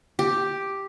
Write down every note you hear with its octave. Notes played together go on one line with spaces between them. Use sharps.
G4